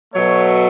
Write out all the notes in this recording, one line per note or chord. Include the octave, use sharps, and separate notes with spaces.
B2 F#3 A3 C#5